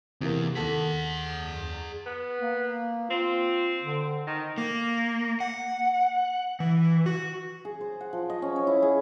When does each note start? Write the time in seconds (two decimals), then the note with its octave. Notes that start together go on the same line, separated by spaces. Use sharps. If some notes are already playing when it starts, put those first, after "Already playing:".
0.21 E2 C3 E3 A#3
0.55 D#2 G#4 A4 F#5 B6
2.06 B3
2.42 A#3
3.11 C4 F4
3.82 D3
4.27 D#3
4.58 A#3
5.40 F#5
6.60 E3
7.06 F#4
7.65 G#4
7.81 C5
8.01 F#5
8.13 F3
8.30 D#5
8.42 C#4
8.56 C#5
8.67 E4
8.82 G#4